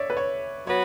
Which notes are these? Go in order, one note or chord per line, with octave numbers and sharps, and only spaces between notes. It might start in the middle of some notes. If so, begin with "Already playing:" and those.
Already playing: C#5 D5 E5
B4
C#5
F#3 B3 F#4 B4 C#5